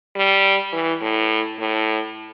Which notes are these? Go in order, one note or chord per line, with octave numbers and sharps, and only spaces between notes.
G3
E3
A2
A2